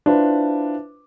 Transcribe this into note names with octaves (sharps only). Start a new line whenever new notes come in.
D4 E4 F4 B4 C5